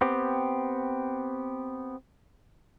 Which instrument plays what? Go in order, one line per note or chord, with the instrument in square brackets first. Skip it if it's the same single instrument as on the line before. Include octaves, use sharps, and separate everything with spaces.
[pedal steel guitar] B3 C4 G4